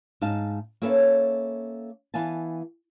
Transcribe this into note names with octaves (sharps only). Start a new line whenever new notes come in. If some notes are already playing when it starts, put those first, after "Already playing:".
G#2 D#4 F5 A5
A#3 C#4 A4 B4 C#5 E5
E3 B3 F5 G#5 A5